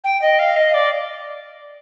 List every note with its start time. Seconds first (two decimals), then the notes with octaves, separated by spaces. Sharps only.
0.04 G5
0.22 D#5
0.39 F5
0.56 D#5
0.74 D5